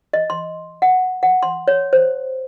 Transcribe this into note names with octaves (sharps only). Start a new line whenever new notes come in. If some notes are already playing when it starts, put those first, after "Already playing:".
D#5
C6
F#5
F#5
C6
C#5
C5